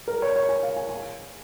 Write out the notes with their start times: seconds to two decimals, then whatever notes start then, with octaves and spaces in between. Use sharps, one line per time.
0.08 A#4
0.22 C#5
0.36 C#5
0.49 G#5
0.63 F5
0.77 G#5
0.89 G#5